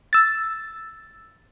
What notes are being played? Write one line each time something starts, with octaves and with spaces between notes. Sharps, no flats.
E6 A6